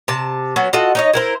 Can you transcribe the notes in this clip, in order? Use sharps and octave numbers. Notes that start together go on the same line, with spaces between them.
C3 A5
F#3 B3 C#4 F#4
F4 F#4 A4 D#5
D#4 C#5 D#5
E4 A#4 C5